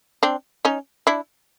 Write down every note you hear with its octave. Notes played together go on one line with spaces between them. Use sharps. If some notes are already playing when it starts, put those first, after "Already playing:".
C4 D4
C#4 D#4
D4 E4